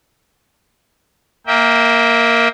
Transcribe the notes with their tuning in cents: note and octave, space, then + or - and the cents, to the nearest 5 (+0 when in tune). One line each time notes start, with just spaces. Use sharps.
A#3 +0 E5 -30 G5 +0